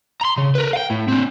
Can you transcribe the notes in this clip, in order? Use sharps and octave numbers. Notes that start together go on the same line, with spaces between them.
A#5 C6
C#3
A#4 B4
F5 G5
A2
C4 D4